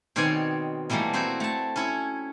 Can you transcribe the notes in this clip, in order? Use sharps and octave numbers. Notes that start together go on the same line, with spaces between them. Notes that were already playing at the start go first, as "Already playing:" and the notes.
B2 D#3 C4 C#5 D5 G#5
B2 E3 G3 A3 A#3
C4 E4 F#4 C5
A3 A5
C#4 E4 C#5